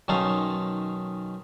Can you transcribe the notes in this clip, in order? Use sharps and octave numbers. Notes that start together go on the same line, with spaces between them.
B1 D#3 C#4 D#4 A4 F5